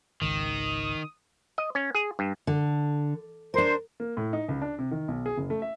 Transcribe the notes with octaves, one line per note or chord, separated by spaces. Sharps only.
G#1 C#2 D#3 D#6
D#5
C#4
G#4
G2
D3
D4 A#4 C5
A#3
A2
D#4
C#2
D4
C3
D#3
B1
G#4
F#1
A3
E5